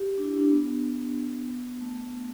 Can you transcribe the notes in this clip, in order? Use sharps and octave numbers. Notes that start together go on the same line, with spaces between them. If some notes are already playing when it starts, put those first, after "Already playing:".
Already playing: G4
D4
E4
D4
B3
A3